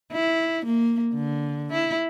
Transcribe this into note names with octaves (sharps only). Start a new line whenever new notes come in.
E4
A#3
D3
E4